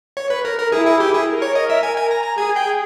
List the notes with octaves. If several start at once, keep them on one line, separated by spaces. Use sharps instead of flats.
C#5
B4
A#4
A#4
E4 G#4
G#4
G4
G#4
A#4
C#5
D#5
E5
G#5
G#5
A#5
A#5
G#4 G#5
G5